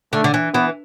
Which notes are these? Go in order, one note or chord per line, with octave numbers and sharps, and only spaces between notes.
D3 A3
D3
E3
E3 B3